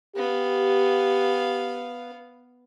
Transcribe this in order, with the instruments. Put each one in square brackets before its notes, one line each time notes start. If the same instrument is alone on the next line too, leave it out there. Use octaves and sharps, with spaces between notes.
[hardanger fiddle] B3 F5 [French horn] G4